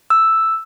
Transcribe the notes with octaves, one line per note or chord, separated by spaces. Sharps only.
E6